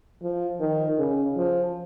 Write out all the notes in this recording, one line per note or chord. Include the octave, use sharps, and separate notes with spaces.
F3
D#3
C#3
F3